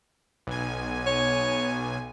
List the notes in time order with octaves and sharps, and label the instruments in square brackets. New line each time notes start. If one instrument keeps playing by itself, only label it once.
[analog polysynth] B1 G#5
[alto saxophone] C#5